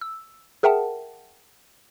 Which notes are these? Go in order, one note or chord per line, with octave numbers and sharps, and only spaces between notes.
E6
G#4 A#4 E5 F#5 G5 A5